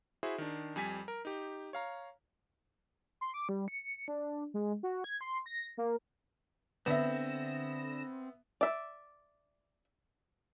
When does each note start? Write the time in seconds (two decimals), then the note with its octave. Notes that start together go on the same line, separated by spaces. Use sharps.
0.23 E4 F#4 G#4 C5 E5
0.38 D#3 D4
0.76 F2 G3 G#5 B6
1.08 A#4
1.25 D#4 G4
1.73 C#5 F5 A#5
3.21 C6
3.34 D6
3.49 G3
3.68 C#7
4.08 D4
4.54 G#3
4.83 F#4
5.04 G#6
5.21 C6
5.46 A#6
5.78 A#3
6.86 D3 B3 C4 E5 A#6 E7
8.61 D5 E5